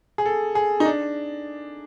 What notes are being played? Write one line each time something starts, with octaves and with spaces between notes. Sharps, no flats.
G#4
A4
G#4
D#4
D4